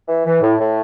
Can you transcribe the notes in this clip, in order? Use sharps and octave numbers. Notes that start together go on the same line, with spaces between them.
E3
E3
A2
A2